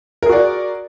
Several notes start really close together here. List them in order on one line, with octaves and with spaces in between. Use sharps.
A#4 G#4 F#4 D5